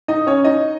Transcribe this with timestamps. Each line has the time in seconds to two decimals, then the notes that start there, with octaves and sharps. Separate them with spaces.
0.08 D#4 D#5
0.27 C#4 C#5
0.44 D#4 D#5